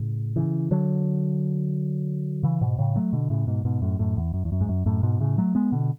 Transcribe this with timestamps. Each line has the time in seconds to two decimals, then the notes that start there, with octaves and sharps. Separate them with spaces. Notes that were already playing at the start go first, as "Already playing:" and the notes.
Already playing: A2 C#3
0.36 C#3 E3
0.71 D3 F#3
2.43 C#3 E3
2.61 G#2 B2
2.78 A2 C#3
2.96 F#3 A3
3.13 B2 D3
3.30 A2 C#3
3.47 G#2 B2
3.65 G#2 B2
3.82 F#2 A2
3.99 F#2 A2
4.17 E2
4.34 F#2
4.45 E2
4.52 F#2
4.61 G#2
4.69 F#2
4.86 F#2 A2
5.03 G#2 B2
5.20 A2 C#3
5.38 F#3 A3
5.55 G#3 B3
5.72 B2 D3